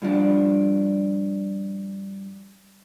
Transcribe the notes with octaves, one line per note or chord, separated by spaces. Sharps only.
G2 F3 D4